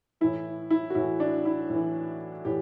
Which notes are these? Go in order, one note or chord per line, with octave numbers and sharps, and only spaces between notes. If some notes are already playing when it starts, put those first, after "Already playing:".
A2 E3 E4
E4
F#4
A2 E3 E4
D4
E4
A2 E3
A2 E3 G4